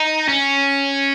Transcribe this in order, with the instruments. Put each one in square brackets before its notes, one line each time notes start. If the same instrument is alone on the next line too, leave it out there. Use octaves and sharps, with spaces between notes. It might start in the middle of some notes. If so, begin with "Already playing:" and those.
Already playing: [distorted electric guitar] D#4
C#4